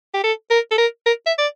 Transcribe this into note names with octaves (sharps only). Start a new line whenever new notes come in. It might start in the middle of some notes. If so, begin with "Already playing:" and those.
G4
A4
A#4
A4
A#4
A#4
E5
D5